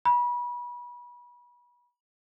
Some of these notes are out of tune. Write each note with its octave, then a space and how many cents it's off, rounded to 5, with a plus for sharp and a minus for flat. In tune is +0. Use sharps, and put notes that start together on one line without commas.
B5 -30